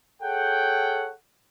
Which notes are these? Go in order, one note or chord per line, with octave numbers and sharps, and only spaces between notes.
G#4 A4 C#5 F#5 G5